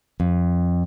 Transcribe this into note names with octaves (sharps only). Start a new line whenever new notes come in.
F2